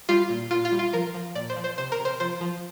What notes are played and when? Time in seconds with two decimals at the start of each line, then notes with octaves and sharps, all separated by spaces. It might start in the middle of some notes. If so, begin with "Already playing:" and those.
0.09 G3 F4
0.30 A#2
0.51 A#2 F4
0.65 F4
0.72 G3
0.79 F4
0.93 F3 A#4
1.14 F3
1.35 A#2 D5
1.50 C5
1.56 F3
1.64 C5
1.78 C3 C5
1.92 A#4
1.99 C3
2.05 C5
2.20 F3 C5
2.41 F3